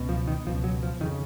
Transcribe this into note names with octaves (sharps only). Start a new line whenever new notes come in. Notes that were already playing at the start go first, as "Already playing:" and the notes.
Already playing: C#2 B2
F3
D#3
C#2 B2 F3
F#3
F3
F2 C#3 D#3